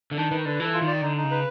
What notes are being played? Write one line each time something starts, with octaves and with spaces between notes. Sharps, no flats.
D3
D#3 D4
D#3 B4
D3 B4
E3 A4
F4
D#3
D5
D3 D#4
D#4
C#3
B4